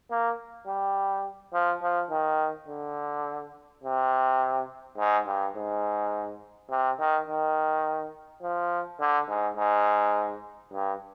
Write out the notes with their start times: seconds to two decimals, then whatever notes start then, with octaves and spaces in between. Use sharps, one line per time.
0.11 A#3
0.68 G3
1.53 F3
1.82 F3
2.10 D#3
2.68 D3
3.84 C3
4.98 G#2
5.26 G2
5.56 G#2
6.70 C3
6.99 D#3
7.27 D#3
8.42 F3
9.00 D3
9.28 G#2
9.57 G#2
10.73 G2